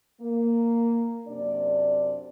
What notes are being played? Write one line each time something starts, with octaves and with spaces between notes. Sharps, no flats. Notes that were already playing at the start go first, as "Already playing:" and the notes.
A#3
F#2 C3 D4 D5